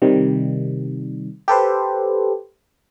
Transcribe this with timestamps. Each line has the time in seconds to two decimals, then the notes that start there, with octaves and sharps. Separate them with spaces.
0.02 C3 D#3 G3
1.48 G4 A4 B4 C5